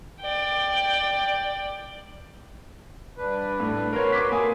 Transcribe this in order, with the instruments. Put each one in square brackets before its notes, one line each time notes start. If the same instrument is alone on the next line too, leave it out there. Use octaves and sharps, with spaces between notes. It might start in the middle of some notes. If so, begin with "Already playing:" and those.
[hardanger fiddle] D5 G5
[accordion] G2 D4 B4
[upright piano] A2
[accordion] F#4 B4 C6 [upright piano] A#4 C#5
[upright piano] D6 B6
[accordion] A3 [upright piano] A#3 G#5 D#6